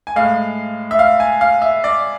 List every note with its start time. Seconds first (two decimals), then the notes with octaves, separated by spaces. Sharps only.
0.07 G#5
0.16 A2 G#3 F5
0.91 E5
0.99 F5
1.20 G#5
1.41 F5
1.62 E5
1.84 D5